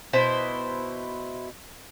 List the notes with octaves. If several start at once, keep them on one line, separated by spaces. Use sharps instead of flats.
B2 E4 C5